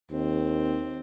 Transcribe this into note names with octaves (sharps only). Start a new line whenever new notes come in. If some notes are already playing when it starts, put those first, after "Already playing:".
D#2 C4